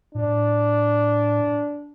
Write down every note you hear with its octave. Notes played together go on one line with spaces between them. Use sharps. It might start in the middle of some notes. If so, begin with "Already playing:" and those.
A2 D4